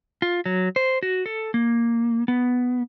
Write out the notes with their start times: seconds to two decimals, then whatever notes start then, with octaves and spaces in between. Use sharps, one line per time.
0.22 F4
0.46 F#3
0.76 C5
1.03 F#4
1.26 A4
1.54 A#3
2.28 B3